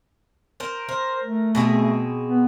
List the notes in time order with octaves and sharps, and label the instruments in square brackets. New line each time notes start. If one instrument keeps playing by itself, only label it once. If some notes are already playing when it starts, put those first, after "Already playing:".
[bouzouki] A#4 C5
[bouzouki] A#4 [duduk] C5
[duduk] A3
[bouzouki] B2 C4 G#4
[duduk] B3